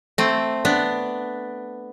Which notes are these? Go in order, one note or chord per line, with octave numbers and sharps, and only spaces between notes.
A3 C4
B3 D4